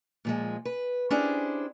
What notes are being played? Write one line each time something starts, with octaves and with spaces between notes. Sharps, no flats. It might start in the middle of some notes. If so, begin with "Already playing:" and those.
A#2 F3 G#3
B4
C#4 D4 E4 G4 G#4 C5